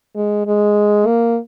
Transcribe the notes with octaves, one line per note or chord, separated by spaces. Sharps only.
G#3
G#3
A#3